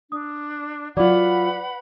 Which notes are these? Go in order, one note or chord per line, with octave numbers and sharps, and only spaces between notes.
D4 D#6
F#3 F4 B4 D5 F#5 B5 D6